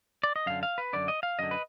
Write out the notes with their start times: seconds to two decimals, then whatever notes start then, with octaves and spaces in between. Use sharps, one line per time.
0.23 D5
0.36 D#5
0.46 F#2 D3 F5
0.63 F5
0.78 B4
0.93 F#2 D3 D5
1.08 D#5
1.23 F5
1.39 F#2 D3 D#5
1.51 B4